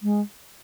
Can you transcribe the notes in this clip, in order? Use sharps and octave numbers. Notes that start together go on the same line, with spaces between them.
G#3